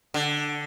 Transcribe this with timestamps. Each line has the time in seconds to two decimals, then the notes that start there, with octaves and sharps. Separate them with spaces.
0.14 D3